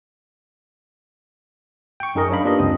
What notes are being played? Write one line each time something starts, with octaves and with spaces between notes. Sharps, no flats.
G5 C#6
F#2 D#4 G#4 A#4 D#5
C#4 D4 C#5 F5 B5
A#3 D4 F4 G4 B4 D#5
C#2 F#2 C4 D#6